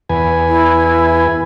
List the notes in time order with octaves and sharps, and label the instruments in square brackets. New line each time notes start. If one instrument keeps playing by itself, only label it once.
[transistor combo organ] E2 B4 G#5
[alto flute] E4